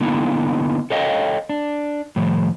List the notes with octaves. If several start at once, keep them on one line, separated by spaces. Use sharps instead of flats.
D3 A#3 B3 D#4 E4
A4 C#5 D#5 F5 G5
D4
A2 D#3 F3